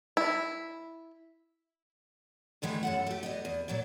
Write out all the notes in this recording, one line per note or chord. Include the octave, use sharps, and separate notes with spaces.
E4
G2 D#3 E3 G#3 A3
F#2 A4 F#5
A3 G4
E2 B3 D#5
E2
A#2 F#3 D5